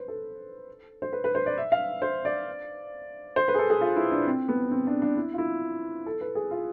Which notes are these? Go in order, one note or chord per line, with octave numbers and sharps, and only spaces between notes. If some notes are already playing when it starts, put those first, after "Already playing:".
Already playing: B4 C5
A4
C5
B4
B4
C5
D5
E5
F5
C5
D5
C5
B4
G#4
A4
G#4
F4
E4
D4
C4
B3
C4
D4
D4
E4
F4
E4
A4
B4
G#4
F4